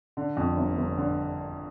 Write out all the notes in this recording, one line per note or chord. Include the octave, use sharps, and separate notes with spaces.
D3
F2
G1
G1
D3